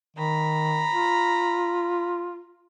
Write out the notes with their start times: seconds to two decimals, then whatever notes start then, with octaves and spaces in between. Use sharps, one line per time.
0.16 D#3 A#5 B5
0.92 F4